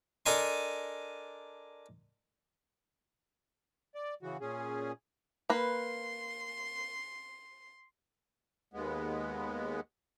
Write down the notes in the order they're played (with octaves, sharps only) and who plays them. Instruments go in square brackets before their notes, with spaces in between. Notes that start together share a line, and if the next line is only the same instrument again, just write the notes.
[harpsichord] D4 A4 A#4 D#5 G#5 C6
[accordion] D5
C#3 E3 F#4
A#2 C#4 G#4
[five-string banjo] A#3 B4 [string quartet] C6
[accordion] D#2 G#3 B3